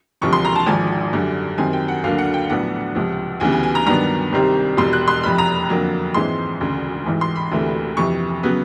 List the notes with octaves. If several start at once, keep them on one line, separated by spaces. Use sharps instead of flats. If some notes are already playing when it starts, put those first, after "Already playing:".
E1 D2 C3 F3 C#6
C6
A#5
A5
G#1 G#2 F3 G#5
F#2 D3 G3
F#2 D#3 G3 C4 G#5
G5
F#5
D2 D3 F#3 A#3 D4 F5
F#5
G5
A#1 A2 F#3 B3 D4 F#5
C#2 C3 F3
D2 C#3 E3 G3 B3 G#5
G#5
G#5
A#5
G2 D#3 F#3 B3 D4 A#5
C2 C3 D#3 G3 C4
E1 E2 B2 G3 C6
F#6
C6
F1 F2 C3 B5
A#5
F2 D3 F#3 A#3
A#1 G#2 E3 G#3 C4 C6
E1 D2 C#3
A1 G#2 E3
C6
B5
E1 D2 C3 E3 A3
F2 C3 E3 C#6
C#3 F#3 B3